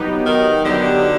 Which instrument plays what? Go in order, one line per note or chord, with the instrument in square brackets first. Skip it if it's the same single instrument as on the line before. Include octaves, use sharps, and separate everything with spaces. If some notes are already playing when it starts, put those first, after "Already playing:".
Already playing: [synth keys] F#3 B3 D#4 G4
[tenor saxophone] D#3
[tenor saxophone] D3 [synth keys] F#3 B3 D#4 G4